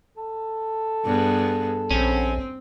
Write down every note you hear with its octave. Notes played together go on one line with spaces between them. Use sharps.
A4
G2 B3 G#4
A#1 C4 C#4